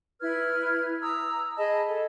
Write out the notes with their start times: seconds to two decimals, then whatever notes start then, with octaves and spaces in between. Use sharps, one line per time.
0.21 E4 B4 F6 G#6
1.02 A#5 D#6 E6
1.57 G#4 D#5 A5 B5
1.87 A4